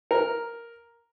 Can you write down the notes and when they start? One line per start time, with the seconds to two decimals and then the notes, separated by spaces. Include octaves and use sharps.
0.11 A#4